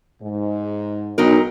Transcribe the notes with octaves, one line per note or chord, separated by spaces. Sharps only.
G#2
B1 F#3 D#4 A#4